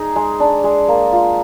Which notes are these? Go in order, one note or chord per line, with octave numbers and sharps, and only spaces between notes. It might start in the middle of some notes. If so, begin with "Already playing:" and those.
Already playing: D#4 G#4
G#3
D4
G#3
A#3
F4